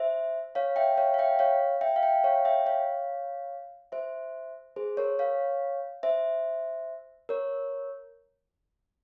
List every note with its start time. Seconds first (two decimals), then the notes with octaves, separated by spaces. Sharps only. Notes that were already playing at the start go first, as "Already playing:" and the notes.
Already playing: C5 E5
0.55 C#5 F5
0.76 E5 G5
0.97 C#5 F5
1.14 F5
1.19 E5 G5
1.39 C#5 F5
1.81 E5 G5
1.96 F5
2.03 E5 G5
2.24 C#5 F5
2.45 E5 G5
2.66 C#5 F5
3.92 C5 E5
4.76 G#4 C5
4.97 A#4 C#5
5.19 C#5 F5
6.03 C5 E5
7.29 A#4 C#5